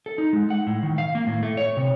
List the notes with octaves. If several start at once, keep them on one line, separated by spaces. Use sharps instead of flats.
A4
D#4
G#3
F#5
A2
D#3
F5
A#3
A2
A3
C#5
C3